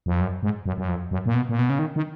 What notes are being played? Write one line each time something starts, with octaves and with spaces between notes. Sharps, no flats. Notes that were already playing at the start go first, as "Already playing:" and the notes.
F2
F#2
G#2
F#2
F#2
F2
F#2
A#2
B2
A#2
B2
C#3
D#3
D#3